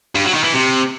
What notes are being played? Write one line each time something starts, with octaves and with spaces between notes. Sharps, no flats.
G2
F#3
D#3
E3
C3